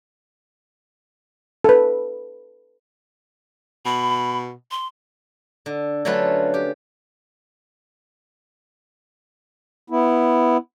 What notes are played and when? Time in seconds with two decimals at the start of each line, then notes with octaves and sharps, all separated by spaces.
1.64 A4 B4
3.85 B2 B5
4.71 C6
5.66 D3
6.05 D3 F#3 A3 C#4 F4 B4
6.54 G4
9.90 B3 E4